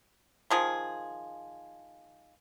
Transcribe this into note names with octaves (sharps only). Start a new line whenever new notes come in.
D#3 F3 G#4